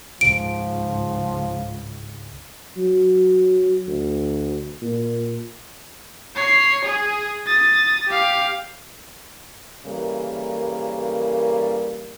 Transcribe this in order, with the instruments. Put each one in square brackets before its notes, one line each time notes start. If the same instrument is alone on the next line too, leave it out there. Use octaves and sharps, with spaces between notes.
[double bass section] C#2 G#2 [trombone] F3 [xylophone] D7
[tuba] F#3
D2
A#2
[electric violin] C#5 C7
G#4
D#6 A6
G4 F5
[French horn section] C#3 E3 G3 A#3 A4 A#4